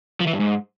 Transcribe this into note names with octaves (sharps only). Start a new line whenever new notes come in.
F3
E3
G2
G#2